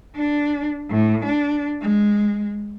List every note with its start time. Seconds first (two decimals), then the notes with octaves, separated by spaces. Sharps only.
0.16 D4
0.90 A2
1.25 D4
1.82 G#3